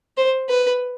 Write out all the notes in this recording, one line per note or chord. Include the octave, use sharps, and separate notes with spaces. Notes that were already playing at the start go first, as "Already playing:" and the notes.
C5
B4